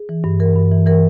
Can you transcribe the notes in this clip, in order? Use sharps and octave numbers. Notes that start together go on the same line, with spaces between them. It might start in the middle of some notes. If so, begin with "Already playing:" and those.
Already playing: G#4
E3
G2
E3 A#4
G2
E3
E3 A#4